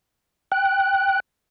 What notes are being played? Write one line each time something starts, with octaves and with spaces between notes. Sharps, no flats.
G5 F#6